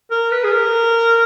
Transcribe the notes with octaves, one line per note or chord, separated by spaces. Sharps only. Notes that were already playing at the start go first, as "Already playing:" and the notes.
A#4
B4
G#4
A#4